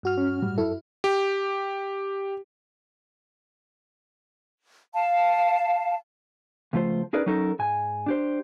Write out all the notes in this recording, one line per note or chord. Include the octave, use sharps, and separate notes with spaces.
G2 F#4 F6
C#4
A2 G3
F#2 E4 A4
G4
F5 A5
C#2 F3 A3 F4 C5
C#4 D#4 G#4 A#4 B4 D5
F#3 C#4 D#4 A4 A#4
G#2 G#5
D4 G4 C5